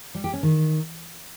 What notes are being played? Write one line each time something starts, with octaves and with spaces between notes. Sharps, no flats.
G3
G4
C#4
D#3